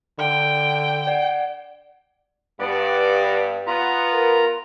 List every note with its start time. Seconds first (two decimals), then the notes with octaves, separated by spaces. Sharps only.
0.19 D3 G5
1.07 D5 F#5
2.60 G2 B3 D5
3.67 B3 F4 A#5
4.13 A#4